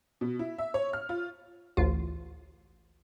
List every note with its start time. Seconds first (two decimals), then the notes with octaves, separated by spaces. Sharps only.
0.21 B2
0.39 E4
0.58 E5
0.74 C#5
0.93 F6
1.09 F4
1.77 A1 D2 F4